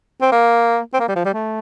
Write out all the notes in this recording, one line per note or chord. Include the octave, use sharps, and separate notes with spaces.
C4
A#3
C4
A#3
G3
F3
G3
A3